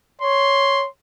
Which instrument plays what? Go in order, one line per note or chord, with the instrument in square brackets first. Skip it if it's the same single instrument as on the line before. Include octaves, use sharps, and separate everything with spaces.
[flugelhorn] C#5 [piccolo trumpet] C6